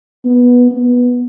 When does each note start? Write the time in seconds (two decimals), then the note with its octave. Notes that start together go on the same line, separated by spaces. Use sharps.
0.25 B3
0.71 B3